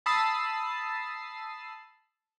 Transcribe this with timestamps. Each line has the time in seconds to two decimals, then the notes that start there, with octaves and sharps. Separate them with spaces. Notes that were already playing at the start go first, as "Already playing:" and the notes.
0.06 A5 B5 D#6 E6 A6 C7